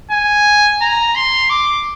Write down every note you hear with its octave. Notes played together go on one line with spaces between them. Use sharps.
G#5
A#5
C6
D6